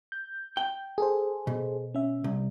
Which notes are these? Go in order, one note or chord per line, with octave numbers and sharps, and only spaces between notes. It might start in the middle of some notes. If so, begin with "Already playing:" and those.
G6
G5
G#4 A4 C5
B2
C#4 E5
C2